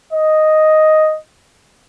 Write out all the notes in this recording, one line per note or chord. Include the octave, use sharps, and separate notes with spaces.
D#5